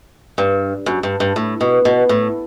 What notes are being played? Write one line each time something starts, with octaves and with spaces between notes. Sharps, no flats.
G2
F#2
G2
G2
A2
B2
B2
A2